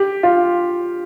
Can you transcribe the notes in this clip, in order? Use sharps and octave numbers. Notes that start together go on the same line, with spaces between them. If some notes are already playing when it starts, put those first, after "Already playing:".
Already playing: G4
F4